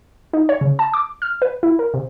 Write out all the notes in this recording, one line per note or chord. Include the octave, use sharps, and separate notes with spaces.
D#4
C#5
C#3
A5
D6
F6
B4
E4
A#4
C3